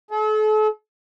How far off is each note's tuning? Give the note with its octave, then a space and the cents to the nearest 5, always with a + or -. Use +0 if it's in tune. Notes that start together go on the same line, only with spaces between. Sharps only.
A4 -40